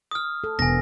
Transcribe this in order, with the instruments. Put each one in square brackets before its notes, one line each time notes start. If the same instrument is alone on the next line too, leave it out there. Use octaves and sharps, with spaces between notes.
[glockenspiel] D#6 F6
[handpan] A4
[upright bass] E1 [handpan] B3 [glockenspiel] G#5 A#6